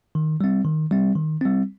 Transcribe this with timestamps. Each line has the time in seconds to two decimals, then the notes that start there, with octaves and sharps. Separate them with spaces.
0.15 D#3
0.41 G3 C4
0.65 D#3
0.91 G3 C4
1.16 D#3
1.41 G3 C4